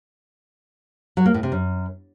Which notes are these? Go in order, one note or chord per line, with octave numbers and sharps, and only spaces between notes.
F#3
A#3
A2
C3
F#2